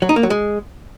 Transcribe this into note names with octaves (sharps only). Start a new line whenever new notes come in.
F#3
D#4
A#3
F#3
G#3